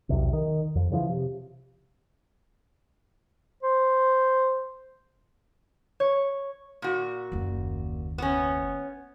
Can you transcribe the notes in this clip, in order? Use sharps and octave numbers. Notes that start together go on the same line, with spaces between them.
B1 E2 C3
D#3
F2
C#3 E3 F3
C3
C5
C#5
A#2 F#4
F#1 D#2
B3 C#4